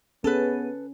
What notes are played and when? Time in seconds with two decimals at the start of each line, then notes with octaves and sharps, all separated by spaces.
0.24 B3 C#4 G#4 A4 B4